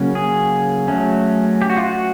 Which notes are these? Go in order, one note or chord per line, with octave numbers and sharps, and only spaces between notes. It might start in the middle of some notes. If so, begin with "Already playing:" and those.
Already playing: C#3 F#3 A#3 C#4
G#4
F#3 A3 C#4
G4
F#4
F4
F#4